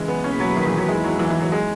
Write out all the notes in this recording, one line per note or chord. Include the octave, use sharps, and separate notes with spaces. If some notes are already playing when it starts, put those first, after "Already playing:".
Already playing: C#3 E3 G#3
B3
B2 A#3 C#4 E4 G#4 B4
F#3
D#3
E3
F#3
E2 D#3 G#3 A#3 E4
F#3
E3
E3
F#3
G#3